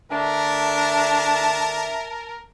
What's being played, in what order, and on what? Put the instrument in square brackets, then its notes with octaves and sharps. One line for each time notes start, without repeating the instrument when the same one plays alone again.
[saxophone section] D3 A3 D4 [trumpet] A#4 [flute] E5 [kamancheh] A5